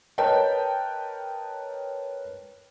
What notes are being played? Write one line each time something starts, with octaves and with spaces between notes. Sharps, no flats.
A#4 B4 C#5 D#5 G5 A5